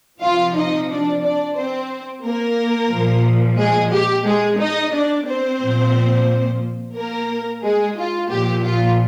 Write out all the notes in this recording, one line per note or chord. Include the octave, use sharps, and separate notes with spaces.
C3 F3 F4 F5
D#4 D#5
D4 D5
D4 D5
C4 C5
A#3 A#4
A#2 F3
G#3 G#4
G4
G#3 G#4
D#4 D#5
D4 D5
C4 C5
A#2 F3
A#3 A#4
G#3 G#4
F4
A#2 F3 G4
F4